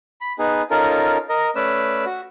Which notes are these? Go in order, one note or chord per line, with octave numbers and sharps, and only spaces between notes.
B5
B3 D#4 G#4
C#4 D#4 F4 A4 A#4
A#4 D#5
A3 C#4 B4 D5 E6
F#4